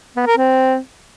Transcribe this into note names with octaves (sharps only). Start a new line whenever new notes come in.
B3
A#4
C4